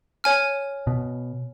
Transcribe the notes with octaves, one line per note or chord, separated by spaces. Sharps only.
C#5 G#5 F6
B2